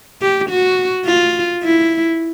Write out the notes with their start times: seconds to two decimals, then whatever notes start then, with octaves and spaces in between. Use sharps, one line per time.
0.21 G4
0.50 F#4
1.05 F4
1.63 E4